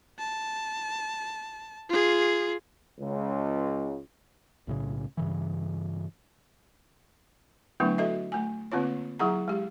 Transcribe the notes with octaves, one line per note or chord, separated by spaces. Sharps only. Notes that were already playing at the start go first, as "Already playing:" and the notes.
A5
F4 G#4
C#2
B1 A2 C#3
G2 C#3 E3
D3 F#3 A3 B3 D4 E4
F#4 A4 D#5 E5
A3 G#5
D3 A#3 C4 F4 C#5
F#3 E4 G#4 F#5 A#5
G#3 G4